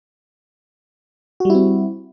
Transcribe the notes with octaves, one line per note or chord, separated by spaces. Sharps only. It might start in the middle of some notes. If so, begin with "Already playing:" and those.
G3 C4 E4 F#4